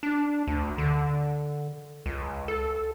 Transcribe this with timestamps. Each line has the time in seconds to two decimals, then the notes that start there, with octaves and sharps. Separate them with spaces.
0.03 D4
0.47 D2
0.78 D3
2.06 C#2
2.48 A4